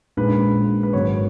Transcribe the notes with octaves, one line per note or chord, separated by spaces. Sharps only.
A#1 A#2 G#3 D#4 B4
B4
G#1 G#2 F#3 B3 C#5